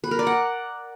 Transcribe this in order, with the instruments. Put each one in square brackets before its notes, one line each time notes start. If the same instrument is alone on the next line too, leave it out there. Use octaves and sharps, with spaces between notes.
[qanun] B4
A#4
D5
F#5